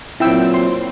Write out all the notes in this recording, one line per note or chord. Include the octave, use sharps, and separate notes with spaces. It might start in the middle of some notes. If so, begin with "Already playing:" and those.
A#2 F#3 C4 E4 G5 E6
C6